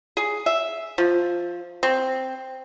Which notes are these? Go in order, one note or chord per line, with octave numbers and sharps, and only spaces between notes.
G#4
E5
F3
C4